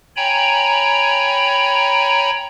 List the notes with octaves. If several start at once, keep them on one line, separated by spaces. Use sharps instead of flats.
C#5 G5 G#5 A#5 B5